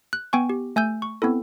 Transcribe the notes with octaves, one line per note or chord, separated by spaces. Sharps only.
F#6
B3 G5 G#5 C#6
G4
A3 G#5 E6 G6
C#6
B3 C4 E4 A4